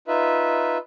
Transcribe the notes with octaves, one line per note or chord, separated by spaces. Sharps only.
D#4 F4 B4 E5